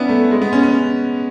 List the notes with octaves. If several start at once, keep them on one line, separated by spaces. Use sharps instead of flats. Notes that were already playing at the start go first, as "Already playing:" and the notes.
Already playing: B3 C#4 D4 E4
A3
G#3
B3
C#4
C#4